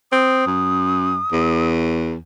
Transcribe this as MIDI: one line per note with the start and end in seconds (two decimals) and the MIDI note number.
0.12 0.42 60
0.12 1.67 87
0.47 1.20 42
1.32 2.15 40